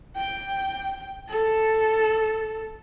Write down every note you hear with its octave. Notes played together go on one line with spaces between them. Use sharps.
G5
A4